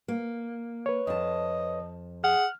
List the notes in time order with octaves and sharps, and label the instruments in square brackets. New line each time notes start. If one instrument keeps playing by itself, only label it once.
[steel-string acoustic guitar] A#3
[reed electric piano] B4 C#5
[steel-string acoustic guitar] F2 A5 [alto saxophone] D#5
[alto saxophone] G#4 [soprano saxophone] F#5 [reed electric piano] F6